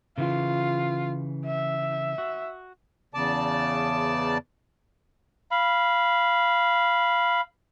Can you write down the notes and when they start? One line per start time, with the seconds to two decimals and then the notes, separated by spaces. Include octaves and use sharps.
0.18 C#3 E3 F4
1.45 E5
2.18 F#4
3.14 E2 C#3 D5 A5
5.51 F5 B5